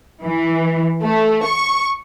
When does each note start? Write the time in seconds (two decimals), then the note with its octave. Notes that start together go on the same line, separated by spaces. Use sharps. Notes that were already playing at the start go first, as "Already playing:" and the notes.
0.23 E3
1.02 A3
1.43 C#6